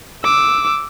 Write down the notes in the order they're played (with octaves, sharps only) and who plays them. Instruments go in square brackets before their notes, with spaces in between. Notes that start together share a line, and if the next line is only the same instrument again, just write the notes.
[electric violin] D6 E6